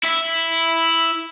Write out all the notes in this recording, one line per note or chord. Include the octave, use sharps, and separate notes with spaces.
E4 E5